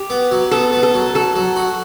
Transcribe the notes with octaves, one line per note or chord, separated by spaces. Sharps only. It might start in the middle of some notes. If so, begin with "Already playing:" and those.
Already playing: G4
B3
F#3
B3 A4
B3
A4
F#3
F#3 A4
F#3
F#4